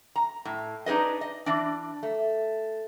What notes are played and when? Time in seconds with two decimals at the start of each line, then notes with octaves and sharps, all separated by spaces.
0.16 A#5
0.45 A2
0.86 D4 D#4 G#4 B4 D#5
1.21 D#5
1.46 E3 D4
2.03 A3